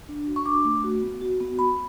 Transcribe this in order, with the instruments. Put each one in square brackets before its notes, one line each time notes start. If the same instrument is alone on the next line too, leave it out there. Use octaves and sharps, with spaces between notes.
[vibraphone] D4
F#4
C#6
D4 D6
A3
F#4
B3
F#4
B3
B3 B5